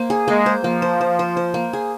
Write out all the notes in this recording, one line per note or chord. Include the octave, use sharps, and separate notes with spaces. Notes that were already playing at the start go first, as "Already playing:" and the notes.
Already playing: A#3 C5
G#4
G#3 A#3
C5
F3 A#3
C5
C5
C5
C5
A#3
G#4